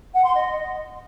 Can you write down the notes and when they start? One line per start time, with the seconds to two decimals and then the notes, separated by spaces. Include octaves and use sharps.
0.14 F#5
0.25 C6
0.36 D#5